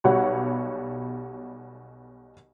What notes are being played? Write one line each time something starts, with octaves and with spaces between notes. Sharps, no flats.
B1 B2 G3 C#5 F#5